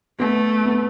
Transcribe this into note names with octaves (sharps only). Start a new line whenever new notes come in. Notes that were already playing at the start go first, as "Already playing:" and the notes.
A3 B3
B3